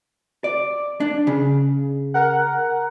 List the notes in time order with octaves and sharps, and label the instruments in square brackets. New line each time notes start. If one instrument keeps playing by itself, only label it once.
[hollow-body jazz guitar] D5
D4
C#3
[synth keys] A#4 F#5